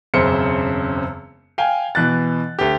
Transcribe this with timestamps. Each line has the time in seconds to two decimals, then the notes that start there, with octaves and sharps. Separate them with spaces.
0.14 E1 F#2 C#3 C4 C5 C#7
1.58 F5 G5 G#5
1.95 B2 E3 F#6 A6
2.59 D2 G4